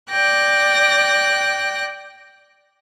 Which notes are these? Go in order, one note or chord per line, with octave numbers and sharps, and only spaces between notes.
D5 G5 F#6 A#6